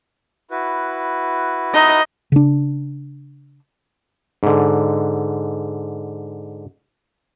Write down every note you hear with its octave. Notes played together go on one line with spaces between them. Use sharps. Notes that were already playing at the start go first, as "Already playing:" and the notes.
E4 F#4 B4
D#4 D#5
C#3 D4
G#2 D3